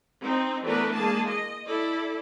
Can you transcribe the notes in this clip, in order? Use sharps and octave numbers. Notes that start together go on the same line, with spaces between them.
C4 D#4
E3 A3 B3 D4 A#4 B4
G#3 A#3 G#4 A5
D#5
E4 A4 D5